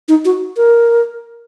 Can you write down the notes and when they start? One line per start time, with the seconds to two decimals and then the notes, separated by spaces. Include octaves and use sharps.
0.08 D#4
0.25 F#4
0.57 A#4